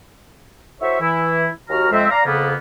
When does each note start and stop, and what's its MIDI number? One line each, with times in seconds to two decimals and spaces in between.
0.81 0.98 64
0.81 0.98 66
0.81 0.98 69
0.81 0.98 72
0.81 0.98 73
0.81 0.98 76
1.00 1.48 52
1.00 1.48 64
1.69 1.88 39
1.69 1.88 66
1.69 1.88 82
1.69 1.88 89
1.91 2.06 41
1.91 2.06 56
1.91 2.06 60
1.91 2.06 76
2.10 2.20 74
2.10 2.20 77
2.10 2.20 82
2.25 2.54 41
2.25 2.54 49
2.25 2.54 58
2.25 2.54 59